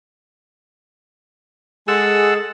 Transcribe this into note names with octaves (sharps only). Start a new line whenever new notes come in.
G#3 G#4 A4 F#5 E6